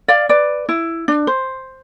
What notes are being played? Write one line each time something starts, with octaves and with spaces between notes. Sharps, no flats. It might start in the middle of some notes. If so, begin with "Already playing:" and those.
D5 F5
B4 D5
E4
D4
C5